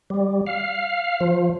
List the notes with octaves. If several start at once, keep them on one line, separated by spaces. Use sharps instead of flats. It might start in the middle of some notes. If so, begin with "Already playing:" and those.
G3
F5
F3